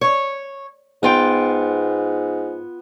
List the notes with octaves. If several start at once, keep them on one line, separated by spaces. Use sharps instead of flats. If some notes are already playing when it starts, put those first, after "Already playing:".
C#5
G#2 B3 F4 G5